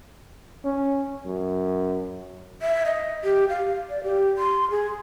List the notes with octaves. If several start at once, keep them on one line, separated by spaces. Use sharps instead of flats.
C#4
F#2
E5
D#5
G4
F5
D5
G4
C6
G#4